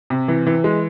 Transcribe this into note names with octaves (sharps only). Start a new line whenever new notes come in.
C3
E3
E3
G#3